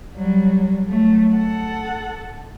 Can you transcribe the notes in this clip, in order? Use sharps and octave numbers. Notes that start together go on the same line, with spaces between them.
F#3 G3
F#3 A3
A4 F#5